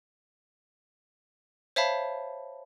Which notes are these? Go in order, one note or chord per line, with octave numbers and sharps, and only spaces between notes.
C5 C#5 E5 F5 A5 B5